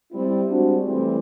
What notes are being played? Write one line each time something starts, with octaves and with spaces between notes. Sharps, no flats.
G3 C4 E4
G3 G#3 C4 D4 F#4
E3 G3 A3 C4 E4